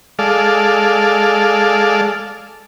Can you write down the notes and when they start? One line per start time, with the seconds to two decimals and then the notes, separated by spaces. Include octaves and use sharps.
0.19 G#3 A4 D5 F5